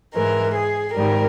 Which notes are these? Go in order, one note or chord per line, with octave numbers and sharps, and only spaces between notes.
G#2 E3 G#3 A#4
G#4
G#2 D#3 G3 A#4